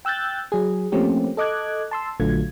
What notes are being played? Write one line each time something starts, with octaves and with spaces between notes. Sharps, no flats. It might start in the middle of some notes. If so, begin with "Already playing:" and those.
G5 E6 F#6 G6 A6
F#3 G#4
F3 A3 A#3 C4 C#4 G4
A4 D#5 D6 F#6 G#6
A5 C6 E6
A#1 D3 F#3 A3 F4 G#6